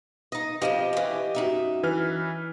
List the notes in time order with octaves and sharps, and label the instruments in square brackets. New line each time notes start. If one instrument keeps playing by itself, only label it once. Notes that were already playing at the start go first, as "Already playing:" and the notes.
[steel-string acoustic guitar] D#4 D#5
[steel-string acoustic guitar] F2 G#2 F3 [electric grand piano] G4 D#5 D#7
[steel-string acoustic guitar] E3 C#4
F#2 D#4 E5
[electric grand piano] E3 B4 F6